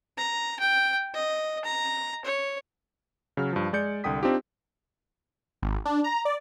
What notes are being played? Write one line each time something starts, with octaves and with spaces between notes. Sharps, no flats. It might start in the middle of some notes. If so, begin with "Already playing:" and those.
A#5
G5
D#5
A#5
C#5
C#3 F#3 F6
G2 F3
G#3 D5 G6 C#7
C2 D3 G5 D#6 B6
C4 D4 D#4 F4 G4
G#1
D4
A#5
D5